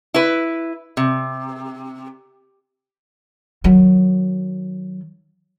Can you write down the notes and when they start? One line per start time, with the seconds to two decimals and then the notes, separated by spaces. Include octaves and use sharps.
0.14 E4 B4
0.97 C3
3.64 D#3 F#3